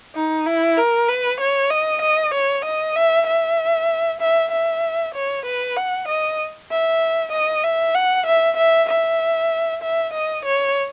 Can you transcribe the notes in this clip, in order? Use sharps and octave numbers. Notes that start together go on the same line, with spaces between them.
D#4
E4
A#4
B4
C#5
D#5
D#5
C#5
D#5
E5
E5
E5
E5
C#5
B4
F#5
D#5
E5
D#5
E5
F#5
E5
E5
E5
E5
D#5
C#5